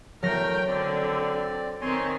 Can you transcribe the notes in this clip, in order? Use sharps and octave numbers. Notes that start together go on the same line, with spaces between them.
E2 F#3 A3 A#4 G5 F6 A#6
D3 C4 D5
D#3 C4 C#5 G#5 C6